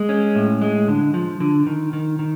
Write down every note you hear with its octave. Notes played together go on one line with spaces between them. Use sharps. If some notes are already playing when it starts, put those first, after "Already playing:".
Already playing: G#3
C#4
A2
G#3
D3
F3
D3
D#3
D#3
D#3